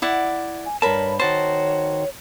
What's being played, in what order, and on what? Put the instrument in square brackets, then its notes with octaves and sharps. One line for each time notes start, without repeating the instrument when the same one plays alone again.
[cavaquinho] E4 D5 F#5
[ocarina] G#5
[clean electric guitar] G2 A5 [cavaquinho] A#4 B5 [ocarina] C#5
[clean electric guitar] D#3 F#4 C5 [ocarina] C#5 [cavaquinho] A5